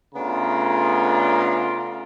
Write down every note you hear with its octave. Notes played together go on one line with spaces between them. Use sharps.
C#3 A3 B3 D4 F4 A#5